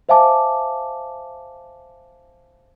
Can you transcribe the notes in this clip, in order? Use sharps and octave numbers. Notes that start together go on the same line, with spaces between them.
C5 E5 F5 G#5 A5 D6